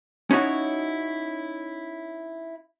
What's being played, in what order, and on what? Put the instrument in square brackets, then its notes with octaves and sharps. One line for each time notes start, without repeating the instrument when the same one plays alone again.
[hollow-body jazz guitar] C#4 D#4 E4 F#4 C#5